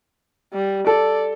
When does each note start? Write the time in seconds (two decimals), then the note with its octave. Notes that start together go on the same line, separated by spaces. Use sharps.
0.54 G3
0.87 A4 D5